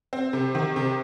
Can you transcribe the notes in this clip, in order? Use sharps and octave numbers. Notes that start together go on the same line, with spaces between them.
C4
C3
D#3
C3